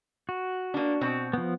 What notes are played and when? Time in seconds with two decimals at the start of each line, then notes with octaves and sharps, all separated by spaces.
0.29 F#4
0.74 A#3 D4
1.01 B2 C4
1.33 F3 B3